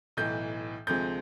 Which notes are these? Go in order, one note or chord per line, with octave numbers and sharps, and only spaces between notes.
B1 A2 E3 G6
D2 C3 F3 G#3 G6